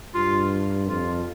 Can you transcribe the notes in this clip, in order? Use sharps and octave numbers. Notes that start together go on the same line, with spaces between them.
G2 F4
F2 F4